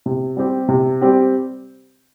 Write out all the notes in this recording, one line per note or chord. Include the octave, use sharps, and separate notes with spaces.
C3
G3 C4 G4
C3
G3 C4 G4